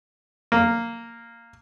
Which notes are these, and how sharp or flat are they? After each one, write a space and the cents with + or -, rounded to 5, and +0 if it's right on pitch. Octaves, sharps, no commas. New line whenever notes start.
A#3 -10